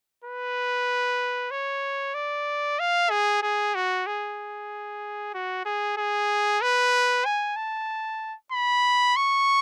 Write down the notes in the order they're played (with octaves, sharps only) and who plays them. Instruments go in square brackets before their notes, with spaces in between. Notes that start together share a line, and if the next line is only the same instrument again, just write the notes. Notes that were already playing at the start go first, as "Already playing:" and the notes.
[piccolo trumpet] B4
C#5
D5
F5
G#4
G#4
F#4
G#4
F#4
G#4
G#4
B4
G#5
A5
B5
C#6